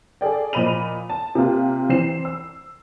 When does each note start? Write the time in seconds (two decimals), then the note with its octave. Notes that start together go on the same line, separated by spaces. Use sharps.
0.21 G#4 A4 D5 G5
0.53 A#2 F3 D#5 B5 D#7 F7
1.10 A5
1.35 C3 A#3 F4 G4
1.89 E3 C4 C7 E7
2.25 E6